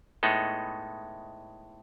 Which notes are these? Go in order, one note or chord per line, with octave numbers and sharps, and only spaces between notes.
A2 G#3 B3 D#4 A4